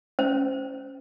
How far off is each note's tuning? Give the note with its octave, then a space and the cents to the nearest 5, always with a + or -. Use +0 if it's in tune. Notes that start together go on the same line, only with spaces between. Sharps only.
C#4 -10 C5 -10